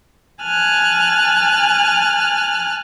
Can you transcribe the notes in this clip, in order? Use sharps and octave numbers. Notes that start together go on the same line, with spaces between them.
G#5 A5 F6 F#6